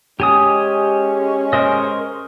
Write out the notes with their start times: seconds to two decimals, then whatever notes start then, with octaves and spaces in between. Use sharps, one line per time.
0.20 G#3 C#4 G4 G#5 D#6
1.53 A#4 C5 D#5